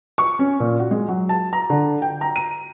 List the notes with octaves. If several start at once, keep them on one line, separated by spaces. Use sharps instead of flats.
C#6
C#4
A#2
F#4
G#3
F#3
A5
A#5
D3
G5
A#5
D#7